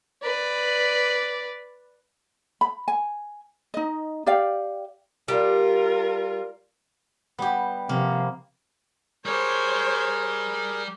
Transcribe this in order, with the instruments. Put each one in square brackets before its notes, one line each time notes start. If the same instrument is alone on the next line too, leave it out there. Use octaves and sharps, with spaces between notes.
[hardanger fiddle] B4 D5
[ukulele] B5
G#5
D#4 D#5
G4 D5 F5 G5
[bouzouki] G3 [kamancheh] F4 A#4
[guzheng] G3 G4 [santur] B3
[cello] C3 F3 [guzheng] A#3
[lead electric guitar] G3 G4 [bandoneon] G#4 A#4 [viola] C5 C#5